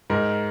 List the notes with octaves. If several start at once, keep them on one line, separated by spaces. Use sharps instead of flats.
G#2 A#4